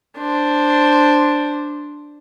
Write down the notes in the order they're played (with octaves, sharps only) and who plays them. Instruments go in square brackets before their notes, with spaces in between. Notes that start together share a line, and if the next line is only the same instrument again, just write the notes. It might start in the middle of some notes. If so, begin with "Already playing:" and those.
[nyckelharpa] D4 C5